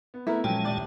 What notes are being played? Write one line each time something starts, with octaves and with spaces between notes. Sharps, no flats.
B3
A3 B3 E4 A#4
A#2 F3 F#3 G#3 C#4 G5 A5
D#1 D5